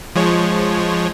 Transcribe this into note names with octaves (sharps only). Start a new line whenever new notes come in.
F3 G#3 C#5